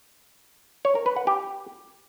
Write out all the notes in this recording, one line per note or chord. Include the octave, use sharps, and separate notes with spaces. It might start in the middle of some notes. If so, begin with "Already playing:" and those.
C#5
A#4
B4
F#5
G4